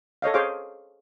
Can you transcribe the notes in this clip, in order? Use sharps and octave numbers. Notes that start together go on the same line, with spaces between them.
A4 C#5 D#5 F5
G#4 C5 C#5 F5 D6